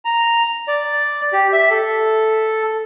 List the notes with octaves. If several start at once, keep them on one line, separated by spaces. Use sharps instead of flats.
A#5
D5
G4
E5
A4